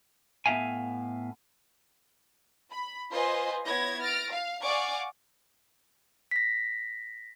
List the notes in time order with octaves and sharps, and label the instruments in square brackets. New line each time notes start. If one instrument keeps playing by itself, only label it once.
[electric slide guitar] A2 B3 D4 E5 F5 G#5
[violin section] B5
F4 B4 C5 D#5 G#5 C6
B3 E4 C#5 G#6 A#6
F6 A6 A#6 D7
F5
D5 F5 F#5 G#5 C#6 D6
[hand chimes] A#6 B6